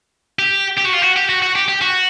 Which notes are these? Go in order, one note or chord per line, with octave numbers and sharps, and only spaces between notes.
G4
G4
F#4
F4
F#4
G4
F#4
F#4
G4
G4
F#4